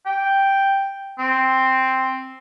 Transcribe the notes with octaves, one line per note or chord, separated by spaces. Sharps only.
G5
C4